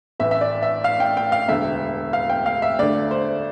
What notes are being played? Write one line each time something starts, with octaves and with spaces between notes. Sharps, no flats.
A1 A2 E3 E5
E5
D5
E5
F5
G5
G5
F5
E1 D2 D3 E5
F5
G5
F5
E5
D2 D3 A3 D5
C5